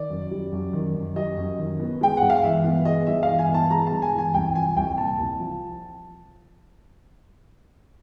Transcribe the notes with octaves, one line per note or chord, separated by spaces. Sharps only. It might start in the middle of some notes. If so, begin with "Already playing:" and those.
Already playing: D#3 D5
F#2
G3
F#2
D#3
F#2
G3 D#5
F#2
D#3
B3
G#3 G5
G2 F#5
F5
E3 E5
B3
G#3 D#5
G2 E5
F5
E3
G#5
B3
A5
G#3 A#5
G2 A5
G#5
E3
G#5
C2 G5
F3 G#5
C2 G5
A#2 A5
C2
F3